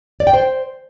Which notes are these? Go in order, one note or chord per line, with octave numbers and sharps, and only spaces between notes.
D5
G5
C5